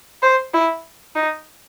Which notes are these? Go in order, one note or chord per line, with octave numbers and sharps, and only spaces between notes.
C5
E4
D#4